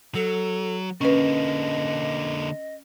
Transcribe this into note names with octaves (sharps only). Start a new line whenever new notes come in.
F#3 A4
D3 A#3 C#4 B4 D#5